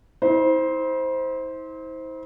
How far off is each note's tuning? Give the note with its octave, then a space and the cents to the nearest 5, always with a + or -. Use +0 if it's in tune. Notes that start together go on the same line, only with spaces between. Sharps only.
E4 -45 C5 +0